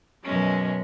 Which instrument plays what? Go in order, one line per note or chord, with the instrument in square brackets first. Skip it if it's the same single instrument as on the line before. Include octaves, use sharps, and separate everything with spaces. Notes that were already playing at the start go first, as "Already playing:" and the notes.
[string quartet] F#2 B2 F#3 G#3 C#4